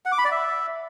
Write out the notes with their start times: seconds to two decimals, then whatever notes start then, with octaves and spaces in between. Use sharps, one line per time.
0.06 F#5
0.12 D6
0.18 B5
0.25 D5
0.31 E5